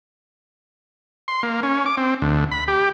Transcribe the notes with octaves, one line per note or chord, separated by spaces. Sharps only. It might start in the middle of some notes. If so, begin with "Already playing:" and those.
C6
A#3
C#4
D6
C4
D2
B5
G4